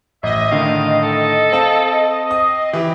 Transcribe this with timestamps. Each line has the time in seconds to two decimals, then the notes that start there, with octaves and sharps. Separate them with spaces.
0.23 A1 D#5 E5
0.51 A2 D3 D#3 F5
1.03 A4
1.52 C4 F5 A5
2.31 C4 D#6
2.73 E3 G4